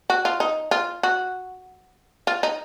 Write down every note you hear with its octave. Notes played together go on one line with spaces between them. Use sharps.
F#4
F4
D#4
F4
F#4
F4
D#4